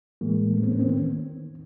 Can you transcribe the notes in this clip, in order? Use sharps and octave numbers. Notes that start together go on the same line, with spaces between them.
A2 E3 G#3 A#3
A3 B3
A#3 C4
B3 C#4
A#3 C4
D#3 B3 C#4